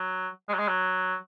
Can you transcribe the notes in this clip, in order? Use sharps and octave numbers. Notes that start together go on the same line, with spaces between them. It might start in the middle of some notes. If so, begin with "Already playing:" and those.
Already playing: F#3
G#3
F#3
G#3
F#3